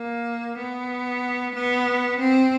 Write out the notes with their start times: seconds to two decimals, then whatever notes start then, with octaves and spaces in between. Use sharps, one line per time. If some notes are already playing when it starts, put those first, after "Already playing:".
Already playing: A#3
0.58 B3
1.55 B3
2.19 C4